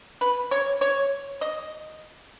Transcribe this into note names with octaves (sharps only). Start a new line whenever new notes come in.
B4
C#5
C#5
D#5